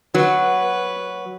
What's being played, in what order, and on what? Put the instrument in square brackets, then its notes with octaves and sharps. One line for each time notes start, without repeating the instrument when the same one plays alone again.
[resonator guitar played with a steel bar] F#3 [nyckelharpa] B4